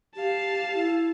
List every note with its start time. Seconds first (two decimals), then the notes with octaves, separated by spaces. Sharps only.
0.16 G4 F5 A5
0.74 E4